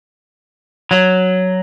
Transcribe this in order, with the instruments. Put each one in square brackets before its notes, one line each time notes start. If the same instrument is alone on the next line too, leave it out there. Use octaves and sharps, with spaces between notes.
[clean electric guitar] F#3